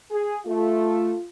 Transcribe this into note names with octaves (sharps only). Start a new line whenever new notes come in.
G#4
A3 F4